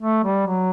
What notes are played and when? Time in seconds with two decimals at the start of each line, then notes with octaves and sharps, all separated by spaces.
0.01 A3
0.24 G3
0.47 F#3